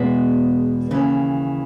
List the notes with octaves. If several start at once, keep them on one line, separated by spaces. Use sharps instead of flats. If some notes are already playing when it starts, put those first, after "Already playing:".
Already playing: E2 B2 G#3 B3 E4
D#2 C#3 E3